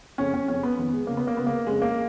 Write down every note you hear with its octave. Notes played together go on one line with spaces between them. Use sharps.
F2 C#3 C#4
C#4
F2 C#3 C#4
B3
F2 D#3 B3
G#3
C#2 C#3 A#3
B3
A#3
C#2 C#3 B3
A#3
F2 C#3 G#3
A#3